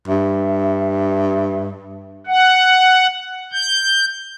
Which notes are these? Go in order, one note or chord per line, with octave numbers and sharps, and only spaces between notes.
G2 E5
F#5
G6